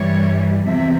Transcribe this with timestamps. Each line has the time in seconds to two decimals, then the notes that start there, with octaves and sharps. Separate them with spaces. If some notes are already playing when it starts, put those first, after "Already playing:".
Already playing: G2 E3 G3 C#5
0.64 E2 C3 F3 E5